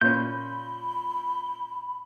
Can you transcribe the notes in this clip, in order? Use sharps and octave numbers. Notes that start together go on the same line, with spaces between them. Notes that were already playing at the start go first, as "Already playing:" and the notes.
A#2 C#4 B5 G6